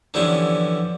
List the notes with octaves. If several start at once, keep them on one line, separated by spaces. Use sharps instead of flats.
D3 E3 F3 G3 B3 C#4